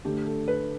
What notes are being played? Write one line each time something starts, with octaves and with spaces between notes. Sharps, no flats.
D2 D3 A3 D4 G4
A4
B4